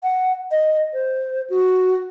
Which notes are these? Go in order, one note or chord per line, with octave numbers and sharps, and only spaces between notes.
F#5
D#5
C5
F#4